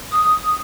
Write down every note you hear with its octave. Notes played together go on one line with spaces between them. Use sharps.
D#6